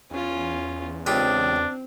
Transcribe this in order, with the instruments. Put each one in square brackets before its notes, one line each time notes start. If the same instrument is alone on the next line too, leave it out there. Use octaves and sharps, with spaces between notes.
[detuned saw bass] E2 [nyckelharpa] C#4 F4
[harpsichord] C#2 F4 G4 [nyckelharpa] C4 [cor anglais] D4